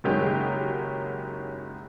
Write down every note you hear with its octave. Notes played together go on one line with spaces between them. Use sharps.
F#1 F#2 D#3 F#3 G#3 G4